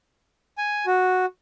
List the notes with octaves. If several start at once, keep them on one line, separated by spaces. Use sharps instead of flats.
G#5
F#4